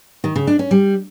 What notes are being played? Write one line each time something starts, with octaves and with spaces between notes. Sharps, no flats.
D#3
C#3
D4
C#4
G3